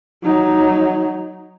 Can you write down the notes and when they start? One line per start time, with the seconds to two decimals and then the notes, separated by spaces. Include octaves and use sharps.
0.24 F#3 D#4